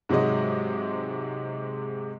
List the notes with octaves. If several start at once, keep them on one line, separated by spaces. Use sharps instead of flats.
G#2 C3 F#3 G#3 D#5